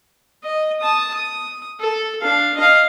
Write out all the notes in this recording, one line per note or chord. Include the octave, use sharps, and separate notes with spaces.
D#5
A5 D#6
D#6
A4
D4 F5
D#5 F5